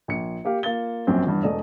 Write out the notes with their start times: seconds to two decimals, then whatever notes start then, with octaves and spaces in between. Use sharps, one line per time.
0.08 A#1 C#7
0.45 A#3 G4 F5
0.63 A#3 F4 A6 G7
1.07 A#1 F#2 C4
1.27 E2 G2
1.43 E1 A3 D5 D#5